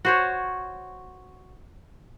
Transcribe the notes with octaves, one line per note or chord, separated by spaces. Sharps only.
F#4 C5 C#5